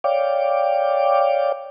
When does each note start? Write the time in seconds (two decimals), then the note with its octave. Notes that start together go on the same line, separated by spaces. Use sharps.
0.04 C#5 D5 F5 G5 D6